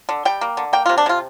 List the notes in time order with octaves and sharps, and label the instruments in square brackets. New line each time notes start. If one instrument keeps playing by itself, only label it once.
[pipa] D3
G3 G5
A#3
D3
A#3 G5
F4
C3
D4
C3 F4